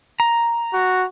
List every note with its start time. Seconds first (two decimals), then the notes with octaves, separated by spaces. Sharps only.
0.20 A#5
0.74 F#4